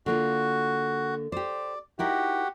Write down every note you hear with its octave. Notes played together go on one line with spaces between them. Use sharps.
D3 A#3 F4 F#4
G4 C5 D5
D#4 E4 F#4 G4 A#4